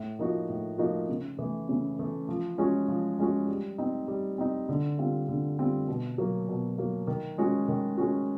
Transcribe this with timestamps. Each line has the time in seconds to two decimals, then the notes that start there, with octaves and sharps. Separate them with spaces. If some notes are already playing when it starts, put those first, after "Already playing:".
Already playing: A2
0.19 F3 A#3 D#4 F#4
0.49 A2
0.78 F3 A#3 D#4 F#4
1.09 C#3
1.39 E3 A3
1.69 C#3
1.99 E3 A3
2.29 F3
2.58 G#3 C#4 F#4
2.88 F3
3.19 G#3 C#4 F#4
3.48 G3
3.78 C4 D#4
4.08 G3
4.38 C4 D#4
4.69 D3
4.98 G3 C4 F4
5.29 D3
5.59 G3 C4 F4
5.88 B2
6.18 F#3 A#3
6.49 B2
6.78 F#3 A#3
7.07 D#3
7.38 G#3 C#4 F#4
7.68 D#3
7.98 G#3 C#4 F#4